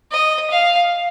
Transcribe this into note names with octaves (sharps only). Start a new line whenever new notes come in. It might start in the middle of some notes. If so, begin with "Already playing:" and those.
D#5
F5